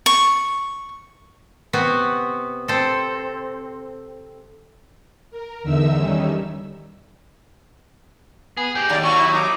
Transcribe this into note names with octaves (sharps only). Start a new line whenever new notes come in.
C#6
C3 B3 C4 F#4
C4 A4
A#4
E2 D3 D#4 E5 E6
D#3 G3 C#4
B3 G#4
G#3 G4 G5
D#2 D5
F#3 C#6
E4
D#4 D6